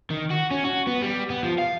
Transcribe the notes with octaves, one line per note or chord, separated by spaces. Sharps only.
D#3
F#4
C#4
F#4
B3
G3
B3
F3
F5